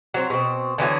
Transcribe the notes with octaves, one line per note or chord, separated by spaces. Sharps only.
F#3 C4
B2 C4
D3 E3 F#3 B3